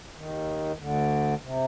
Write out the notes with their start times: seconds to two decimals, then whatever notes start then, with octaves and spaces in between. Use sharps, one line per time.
0.16 D#2 D#3
0.78 D2 D3
1.41 C3